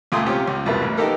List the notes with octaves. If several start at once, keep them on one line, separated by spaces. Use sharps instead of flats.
C#2 A#2 A3 G#5 C6 D#6
C3 C4 C#4 F4 G4
C#2
C2 F2 B2 A#3 B4 E5
A1
A#3 B3 D#4 G4 A4 A#4